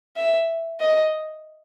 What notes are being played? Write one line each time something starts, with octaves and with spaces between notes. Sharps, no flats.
E5
D#5